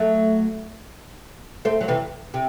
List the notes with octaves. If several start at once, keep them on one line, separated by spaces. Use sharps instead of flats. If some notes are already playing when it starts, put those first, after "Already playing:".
Already playing: F#3 A3
A3 C4
F#3
C3 E3
C3